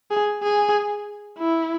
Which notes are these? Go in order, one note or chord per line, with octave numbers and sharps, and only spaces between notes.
G#4
G#4
E4